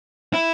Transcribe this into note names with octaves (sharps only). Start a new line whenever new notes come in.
E4